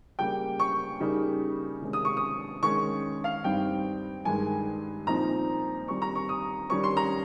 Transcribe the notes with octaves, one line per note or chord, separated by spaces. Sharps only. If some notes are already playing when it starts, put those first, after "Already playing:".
C#3 G3 A#3 G5
C#6
C#3 G3 A#3 D#4
C3 D#3 G#3 C#4
D#6
C#6
D#6
D#3 G#3 C#4 C#6
F5
G2 G3 C4 D#4 G5
G2 D#3 G#3 D#4 G#5
A#2 F3 C4 D#4 A#5
D#3 G3 C4 C#6
A#5
C#6
D#6
D#3 G3 C#4 C#6
C6
A#5